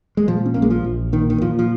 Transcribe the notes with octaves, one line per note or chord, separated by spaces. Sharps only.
G#3
A#2 F3
C#4
A#1 A#3
G#3
F3
A#1
A#2 D#3
D#3
A#2 F3
F3